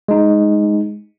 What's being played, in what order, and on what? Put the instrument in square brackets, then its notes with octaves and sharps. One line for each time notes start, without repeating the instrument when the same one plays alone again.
[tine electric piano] G#3 D#4